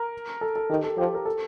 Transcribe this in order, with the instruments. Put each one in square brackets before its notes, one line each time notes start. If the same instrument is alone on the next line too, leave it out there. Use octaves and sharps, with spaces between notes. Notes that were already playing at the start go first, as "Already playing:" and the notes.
Already playing: [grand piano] A#4
A4
A4
[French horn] D#3 [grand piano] G4
[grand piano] A4
[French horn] F3 [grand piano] G4
[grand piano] A#4
A4